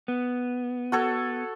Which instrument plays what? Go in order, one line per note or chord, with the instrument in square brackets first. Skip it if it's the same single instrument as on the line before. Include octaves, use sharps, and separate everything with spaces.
[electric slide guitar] B3
[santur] F#4 A4 C#5